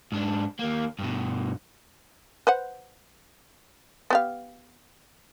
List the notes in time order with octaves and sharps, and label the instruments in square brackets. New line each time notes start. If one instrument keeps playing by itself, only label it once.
[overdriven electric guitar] G#2 D4
D#2 A#3
G2 B2
[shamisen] B4 C5 F#5
B3 G4 F5